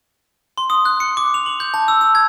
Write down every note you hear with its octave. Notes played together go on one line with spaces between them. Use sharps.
C6
D#6
F#6
C#7
D6
F7
F#7
G6
A5
E6
E6
G#6